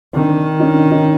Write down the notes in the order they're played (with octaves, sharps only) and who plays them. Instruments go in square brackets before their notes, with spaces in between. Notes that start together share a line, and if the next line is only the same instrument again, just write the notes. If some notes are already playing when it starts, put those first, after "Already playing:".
[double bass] D#3 [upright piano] C4 D4
[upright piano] C#4 D#4
C#4 D#4